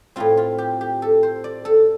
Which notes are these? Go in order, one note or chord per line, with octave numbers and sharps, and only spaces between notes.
A2 A3 C4 F4
F4
G4
G4
A4
C5
D5
A4